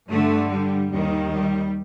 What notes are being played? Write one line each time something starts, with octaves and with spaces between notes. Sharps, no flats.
G2 D3 A3
G3
D#2 D#3 G3
G3